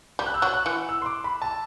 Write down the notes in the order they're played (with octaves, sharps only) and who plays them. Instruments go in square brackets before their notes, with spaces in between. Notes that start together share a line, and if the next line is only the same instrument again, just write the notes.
[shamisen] G3 [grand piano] G6
[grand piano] F#6
E6
[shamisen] F#3 [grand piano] F#6
[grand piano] F#6
[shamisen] E3
[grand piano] E6
C6
D6
B5
A5